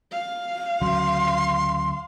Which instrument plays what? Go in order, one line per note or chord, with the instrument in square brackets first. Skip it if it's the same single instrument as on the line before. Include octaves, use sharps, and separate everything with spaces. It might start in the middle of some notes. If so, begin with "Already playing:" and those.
[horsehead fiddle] F5
[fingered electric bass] D2 C#3 F#3 [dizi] C6